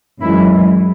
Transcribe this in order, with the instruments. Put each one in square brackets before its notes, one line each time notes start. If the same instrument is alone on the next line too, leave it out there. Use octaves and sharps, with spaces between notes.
[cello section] F#2 E3 G#3 E4